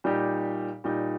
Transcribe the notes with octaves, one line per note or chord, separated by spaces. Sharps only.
A#2 G3 D#4 G4
A#2 G3 D#4 G4